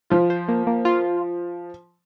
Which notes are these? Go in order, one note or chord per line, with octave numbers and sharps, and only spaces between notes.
F3 F4
C5
A#3
A#3
F4